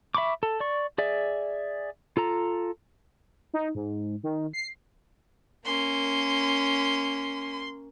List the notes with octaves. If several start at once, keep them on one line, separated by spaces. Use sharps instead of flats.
E5 B5 C#6 D6
A4
D5 C#6
G#4 D5 E5
F4 A4 A#5
D#4
G#2
D#3
C7
A#3 C#4 C6